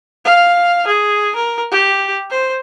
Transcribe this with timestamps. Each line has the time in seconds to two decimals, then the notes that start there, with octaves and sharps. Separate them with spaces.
0.25 F5
0.87 G#4
1.36 A#4
1.71 G4
2.30 C5